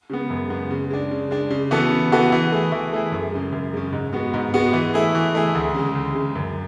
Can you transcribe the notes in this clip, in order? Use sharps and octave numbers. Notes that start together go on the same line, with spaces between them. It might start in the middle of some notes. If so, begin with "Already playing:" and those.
C#3 G#3 B3
F#2
C#3 G#3 B3
C#3
G#3 D4
C#3
G#3 D4
C#3
E3 B3 F#4 A4
C#3
E3 B3 F#4 A4
E3
A3 E4 G#4
E3
A3 E4 G#4
F#2
C#3 G#3
F#2
C#3 G#3
G#2
G#3 B3 F#4
G#2
G#3 B3 F#4
E3
A3 E4 G#4
E3
A3 E4 G#4
D2
C#3 G#3
D2
C#3 G#3
F#2